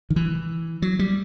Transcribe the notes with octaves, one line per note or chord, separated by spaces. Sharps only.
D#3
E3
F#3
G3